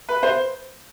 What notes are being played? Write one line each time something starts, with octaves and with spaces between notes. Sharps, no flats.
B4
C5